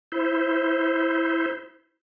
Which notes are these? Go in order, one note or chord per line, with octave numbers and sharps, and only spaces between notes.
E4 C5